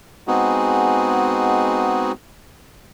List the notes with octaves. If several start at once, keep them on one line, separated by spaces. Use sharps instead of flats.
G#3 B3 C4 D#4 F#4 G#4